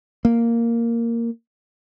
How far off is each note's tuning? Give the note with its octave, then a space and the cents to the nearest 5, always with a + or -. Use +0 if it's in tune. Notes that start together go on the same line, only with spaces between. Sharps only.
A#3 -5